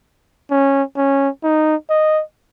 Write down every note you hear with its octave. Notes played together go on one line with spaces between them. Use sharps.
C#4
C#4
D#4
D#5